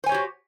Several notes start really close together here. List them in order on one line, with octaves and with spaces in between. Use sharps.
C5 G#5 C#5 G4 F#4